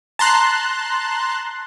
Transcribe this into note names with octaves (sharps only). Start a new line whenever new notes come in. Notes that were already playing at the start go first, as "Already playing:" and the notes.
A5 A#5 C6 F#6